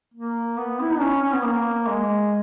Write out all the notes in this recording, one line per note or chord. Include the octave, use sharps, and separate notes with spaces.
A#3
B3
E4
D#4
C#4
C#4
B3
A#3
G#3